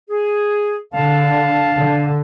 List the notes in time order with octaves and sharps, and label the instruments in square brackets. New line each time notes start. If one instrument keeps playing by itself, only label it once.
[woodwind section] G#4
[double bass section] D3 [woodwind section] F5 A5
[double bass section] D3